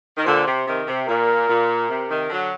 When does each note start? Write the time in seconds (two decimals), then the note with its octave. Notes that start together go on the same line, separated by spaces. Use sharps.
0.17 D#3
0.25 A#2 D3 C5
0.46 C3
0.66 C3 D#3
0.86 C3
1.07 A#2 A#4
1.48 A#2
1.89 C3
2.09 C3 D#3
2.29 D3 F#3